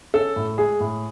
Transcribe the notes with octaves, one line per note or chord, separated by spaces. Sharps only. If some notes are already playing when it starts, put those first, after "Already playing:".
C#4 A4
A2
G#3 G#4
A2